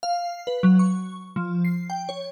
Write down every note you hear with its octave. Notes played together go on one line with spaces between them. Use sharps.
F5
B4
F#3
C#6
F3
C7
G5
C#5